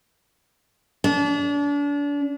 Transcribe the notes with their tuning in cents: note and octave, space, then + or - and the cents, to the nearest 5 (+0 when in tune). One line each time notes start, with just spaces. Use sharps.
D4 -35